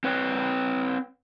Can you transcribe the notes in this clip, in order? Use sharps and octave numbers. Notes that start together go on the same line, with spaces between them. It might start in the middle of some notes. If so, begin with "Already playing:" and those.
C4 B4 C#5 G5